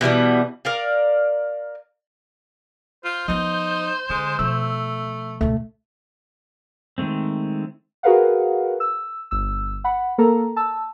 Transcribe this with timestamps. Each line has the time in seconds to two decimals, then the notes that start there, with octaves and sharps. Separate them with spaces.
0.01 B2 E3 G3 B3
0.65 A#4 D5 F5
3.05 F4 C5
3.28 F3 B3 D#4
4.10 D3 G#3
4.39 B2 F3 A3 E6
5.41 C#2 B2 A3
6.98 D#3 G#3 A3 C4
8.03 F#4 G#4 A#4 B4 F5 F#5
8.80 E6
9.31 G1 E6
9.84 F#5 B5
10.18 A#3 A4 A#4 A#5
10.56 A5 E6